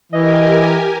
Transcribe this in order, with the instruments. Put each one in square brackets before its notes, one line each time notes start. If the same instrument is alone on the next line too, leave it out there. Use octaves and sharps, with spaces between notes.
[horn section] E3 [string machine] G4 A#4 G#5 [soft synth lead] D#5